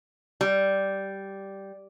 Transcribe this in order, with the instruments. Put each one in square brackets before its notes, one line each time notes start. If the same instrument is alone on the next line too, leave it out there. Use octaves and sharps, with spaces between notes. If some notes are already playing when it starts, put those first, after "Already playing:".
[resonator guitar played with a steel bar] G3